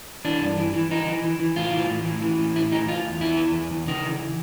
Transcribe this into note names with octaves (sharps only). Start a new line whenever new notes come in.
E3 D4
G2
E3
E3
E3 D#4
E3
E3
E3
A2 F4
E3
A2
E3
E3
A2
A2 E4
E3 D#4
E3 F4
E2
E2 E4
E3
E2
E2
C#3 D#4
E3